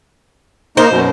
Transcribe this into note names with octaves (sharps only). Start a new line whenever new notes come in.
A#3 D#4 C5
F#2 B2